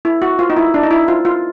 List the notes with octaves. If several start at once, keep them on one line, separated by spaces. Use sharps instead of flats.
E4
F#4
F4
D#4
E4
D4
D#4
E4
F4
F4